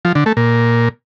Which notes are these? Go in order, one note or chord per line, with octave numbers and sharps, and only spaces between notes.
F3
D3
A3
A#2